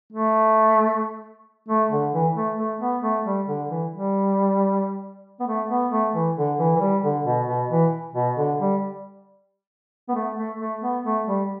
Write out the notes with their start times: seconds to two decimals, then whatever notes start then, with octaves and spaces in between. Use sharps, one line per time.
0.13 A3
1.69 A3
1.91 D3
2.13 E3
2.35 A3
2.58 A3
2.80 B3
3.02 A3
3.25 G3
3.47 D3
3.69 E3
3.91 G3
5.40 B3
5.47 A3
5.69 B3
5.91 A3
6.14 E3
6.37 D3
6.59 E3
6.76 E3
6.81 G3
7.03 D3
7.25 B2
7.47 B2
7.70 E3
8.14 B2
8.36 D3
8.59 G3
10.09 B3
10.15 A3
10.37 A3
10.60 A3
10.81 B3
11.04 A3
11.27 G3